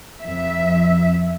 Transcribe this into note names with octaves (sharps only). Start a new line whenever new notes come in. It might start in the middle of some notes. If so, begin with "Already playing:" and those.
F2 E5